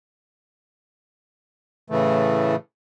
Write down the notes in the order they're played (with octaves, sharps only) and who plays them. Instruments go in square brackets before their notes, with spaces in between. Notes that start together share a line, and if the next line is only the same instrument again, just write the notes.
[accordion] A2 C#3 E3 A3